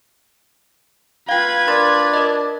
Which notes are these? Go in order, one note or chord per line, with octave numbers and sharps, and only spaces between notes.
F4 B4 F5 G5 G#6
D4 A#4 C6 A6
A#4 D#5